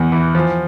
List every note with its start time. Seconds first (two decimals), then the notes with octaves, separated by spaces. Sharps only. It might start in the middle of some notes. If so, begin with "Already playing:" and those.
Already playing: E2 E3
0.12 E3
0.35 F3